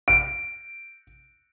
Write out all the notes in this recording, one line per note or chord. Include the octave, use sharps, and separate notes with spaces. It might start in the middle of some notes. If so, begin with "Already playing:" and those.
D7